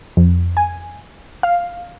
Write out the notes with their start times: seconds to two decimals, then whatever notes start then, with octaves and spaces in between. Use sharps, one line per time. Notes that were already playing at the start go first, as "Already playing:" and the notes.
0.17 F2
0.57 G#5
1.43 F5